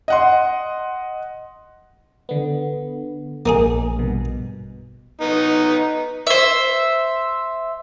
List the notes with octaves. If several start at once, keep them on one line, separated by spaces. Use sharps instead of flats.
D#5 F#5 C6
D3 B3
A#1 A#3 D#4 G#4
G2 B2
B3 D#4
C5 E5